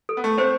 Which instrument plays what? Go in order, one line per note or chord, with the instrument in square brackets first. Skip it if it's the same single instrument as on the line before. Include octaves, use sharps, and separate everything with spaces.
[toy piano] A4
[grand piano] B3
A3
[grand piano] A3 C4 [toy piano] C5